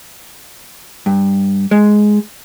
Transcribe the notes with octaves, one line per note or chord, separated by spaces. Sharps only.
G2
G#3